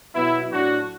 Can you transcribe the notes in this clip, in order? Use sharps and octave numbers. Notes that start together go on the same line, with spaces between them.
B2 F#3 B3 E4
A2 F#3 D4 F#4